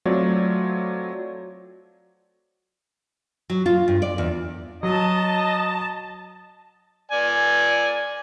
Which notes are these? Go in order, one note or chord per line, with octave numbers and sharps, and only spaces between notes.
F#3 A3 C4 F4 C#5 D5
F#3
F4
G2
D5
E2
F#3 D#5 A5
D5 G#5